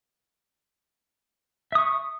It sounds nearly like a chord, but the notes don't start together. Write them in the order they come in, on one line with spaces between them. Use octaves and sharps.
E5 D#6 C#6